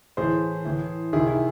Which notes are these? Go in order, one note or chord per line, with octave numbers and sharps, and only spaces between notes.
A2 E3 G#4 C5
A2 E3
C3 D#3 E4 G#4
E4